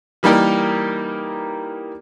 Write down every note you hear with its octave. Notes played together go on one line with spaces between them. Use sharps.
E3 G3 A#3 D#4 G4 A#4